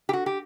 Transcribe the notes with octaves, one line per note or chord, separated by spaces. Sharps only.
G4
F#4
G4